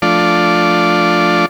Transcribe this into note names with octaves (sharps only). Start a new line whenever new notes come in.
F3 A3 D4 F4 D5